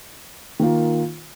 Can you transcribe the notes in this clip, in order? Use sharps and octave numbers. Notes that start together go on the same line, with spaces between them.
D#3 A#3 F4